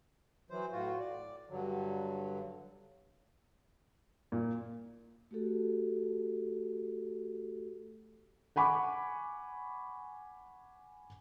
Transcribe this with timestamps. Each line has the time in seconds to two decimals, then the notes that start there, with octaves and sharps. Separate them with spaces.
0.51 E3 F#3 C5
0.72 A2 F4 F#4
1.00 D5
1.49 G2 D3 F#3
4.32 A#2
5.31 A3 F#4 G4 A4
8.56 F#5 G#5 B5 C#6 D6